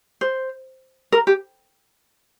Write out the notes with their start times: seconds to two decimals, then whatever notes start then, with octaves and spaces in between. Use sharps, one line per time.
0.21 C5
1.12 A#4
1.27 G4